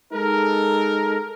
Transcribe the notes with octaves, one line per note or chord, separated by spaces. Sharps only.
G#3 D#4 A4 A#4